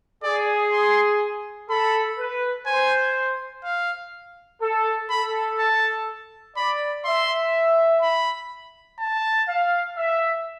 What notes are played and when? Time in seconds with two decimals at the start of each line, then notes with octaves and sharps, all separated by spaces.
0.23 G#4 D5
0.72 C6
1.70 A4 B5
2.18 B4
2.66 C5 G#5
3.64 F5
4.62 A4
5.10 A4 B5
5.58 A5
6.57 D5 B5
7.05 E5 C6
8.02 B5
8.99 A5
9.48 F5
9.97 E5